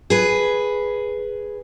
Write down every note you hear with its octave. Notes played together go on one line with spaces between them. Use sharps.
G#4 B4